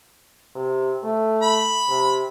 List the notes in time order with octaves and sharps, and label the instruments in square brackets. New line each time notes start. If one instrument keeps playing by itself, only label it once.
[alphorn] C3
A3
[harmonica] B5
[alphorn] C3